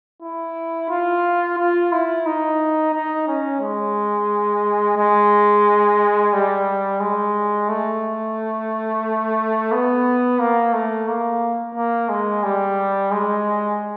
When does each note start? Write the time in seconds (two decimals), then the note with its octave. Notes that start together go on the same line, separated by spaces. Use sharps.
0.22 E4
0.89 F4
1.58 F4
1.92 E4
2.26 D#4
2.94 D#4
3.28 C#4
3.61 G#3
4.97 G#3
6.33 G3
7.00 G#3
7.68 A3
9.72 B3
10.39 A#3
10.73 A3
11.08 A#3
11.75 A#3
12.09 G#3
12.43 G3
13.11 G#3